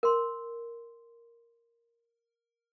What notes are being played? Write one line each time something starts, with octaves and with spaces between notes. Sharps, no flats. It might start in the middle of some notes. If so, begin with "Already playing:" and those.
A#4 C6